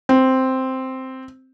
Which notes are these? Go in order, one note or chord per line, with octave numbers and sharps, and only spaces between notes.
C4